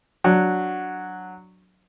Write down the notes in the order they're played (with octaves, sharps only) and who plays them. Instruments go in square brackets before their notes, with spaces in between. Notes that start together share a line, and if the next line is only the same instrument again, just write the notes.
[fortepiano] F#3 D4